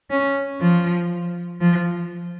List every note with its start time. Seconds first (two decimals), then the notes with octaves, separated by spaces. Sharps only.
0.11 C#4
0.61 F3
1.61 F3